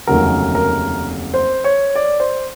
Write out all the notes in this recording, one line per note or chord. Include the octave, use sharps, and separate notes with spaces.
F1 D#2 C#3 F#3 A#4
A#4
C5
C#5
D5
C5